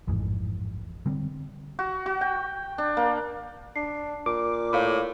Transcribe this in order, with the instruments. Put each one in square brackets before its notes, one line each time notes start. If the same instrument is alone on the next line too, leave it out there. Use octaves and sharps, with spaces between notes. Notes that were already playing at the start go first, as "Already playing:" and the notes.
[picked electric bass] A1 F2 G#2 E3
D3 G3 C4
[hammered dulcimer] F#4
F#4
G5
D4
A#3
[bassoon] D4 [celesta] C7
[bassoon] A#2 [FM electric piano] D6
[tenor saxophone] A2 [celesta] C#5 F5 B5